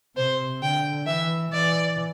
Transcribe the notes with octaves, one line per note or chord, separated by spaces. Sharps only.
C3 C5
D3 G5
E3 E5
E3 D5